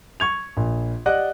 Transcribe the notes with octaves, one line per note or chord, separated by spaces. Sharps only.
C#6 G#6 F7
A#1
G4 D5 D#5 F#5 F#6